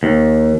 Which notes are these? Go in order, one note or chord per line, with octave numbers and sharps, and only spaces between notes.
D#2